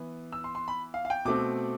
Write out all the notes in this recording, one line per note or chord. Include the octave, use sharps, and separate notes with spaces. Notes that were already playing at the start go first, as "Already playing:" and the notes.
Already playing: E3 B3
E6
C6
C6
B5
F5
F5
G5
B2 A3 C4 D6